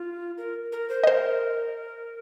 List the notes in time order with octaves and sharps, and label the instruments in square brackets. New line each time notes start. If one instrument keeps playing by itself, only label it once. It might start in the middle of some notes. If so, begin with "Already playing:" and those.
Already playing: [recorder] F4
A#4
A#4
C5
[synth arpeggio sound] D#5
[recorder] A#4 [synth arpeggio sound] C5